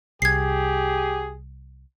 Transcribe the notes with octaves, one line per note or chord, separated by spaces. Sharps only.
C2 G4 G#4 G#6 C7